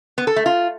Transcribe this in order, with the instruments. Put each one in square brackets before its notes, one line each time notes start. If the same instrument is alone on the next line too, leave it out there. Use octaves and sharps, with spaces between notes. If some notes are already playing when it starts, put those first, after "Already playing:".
[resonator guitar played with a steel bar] B3
A4
A3
F4